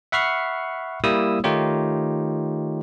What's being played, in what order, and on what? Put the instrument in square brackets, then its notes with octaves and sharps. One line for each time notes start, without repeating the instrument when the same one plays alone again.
[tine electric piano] E5 F#5 B5 C#6 F6 C7
G3 A#3 E4 D#6 E6
D#3 A3 D#4 F4 G4 C#5